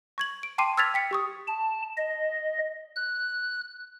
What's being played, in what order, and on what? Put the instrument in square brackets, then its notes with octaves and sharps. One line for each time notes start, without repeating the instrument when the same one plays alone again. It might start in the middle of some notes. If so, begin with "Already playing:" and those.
[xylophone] C#6 G#6 F#7
D7
G5 A5 C6 D6 C7 D#7
E6 F6 G#6 A6 B6 F7
G5 B6 C#7
G4 C#6 D#6
[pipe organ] A5
D#5
F#6